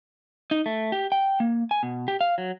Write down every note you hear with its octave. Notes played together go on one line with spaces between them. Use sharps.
D#4
A3
G4
G5
A#3
G#5
B2
G4
F5
F#3